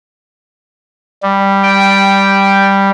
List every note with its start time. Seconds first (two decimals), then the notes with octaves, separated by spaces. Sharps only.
1.23 G3
1.64 G5